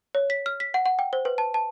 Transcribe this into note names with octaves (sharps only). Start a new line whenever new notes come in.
C#5
B6
F6
B6
F#5
F#5
G5
C5
B4
A5
A5